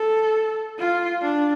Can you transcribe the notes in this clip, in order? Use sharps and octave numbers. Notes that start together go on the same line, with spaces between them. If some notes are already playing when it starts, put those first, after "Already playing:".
Already playing: A4
F4
D4